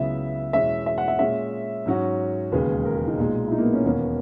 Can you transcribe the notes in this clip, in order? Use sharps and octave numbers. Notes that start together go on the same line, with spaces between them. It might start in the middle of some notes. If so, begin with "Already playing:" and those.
Already playing: C#2 C#3 F#3 B3 E4 E5
E2 B2 G#3 C#4 E4 E5
E5
F#5
E5
A#2 G#3 C#4 E5
G#2 F#3 C#4 F#4
E1 D#2 C#3 G#3 B4
A#4
G#4
D#4
B1 A#2 G#3
E4
D#4
A#3
B3
C#4
E1 D#2 D#3 A#3 B3 C#4